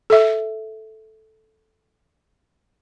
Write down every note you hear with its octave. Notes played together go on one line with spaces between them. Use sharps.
A4 E5